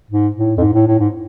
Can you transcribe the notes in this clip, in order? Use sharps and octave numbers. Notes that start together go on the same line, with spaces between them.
G#2
A2
F2
G#2
A2
A2
G#2